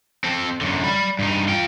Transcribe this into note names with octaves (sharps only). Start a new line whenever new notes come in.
C4 A4
F#2 D3
D5 B5
G2 D#4
F4 G5